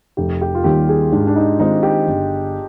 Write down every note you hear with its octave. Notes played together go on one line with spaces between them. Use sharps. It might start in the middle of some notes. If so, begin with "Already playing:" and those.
F1 G4
G4
F4
D#2 D#3 G3 G4
G#4
G#2 D4
D4
D#4
D#3 G#3 C4 D#4 F4
G4
G1